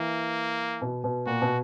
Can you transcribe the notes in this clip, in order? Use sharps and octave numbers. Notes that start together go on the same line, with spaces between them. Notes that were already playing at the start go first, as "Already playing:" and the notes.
Already playing: E3 A#3
B2
B2
A#2 F#4
B2